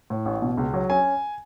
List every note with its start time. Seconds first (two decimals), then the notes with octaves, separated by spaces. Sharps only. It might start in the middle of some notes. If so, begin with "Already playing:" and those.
0.10 A2
0.26 A1
0.42 B2
0.57 C#2
0.74 F#3
0.90 C#4 G#5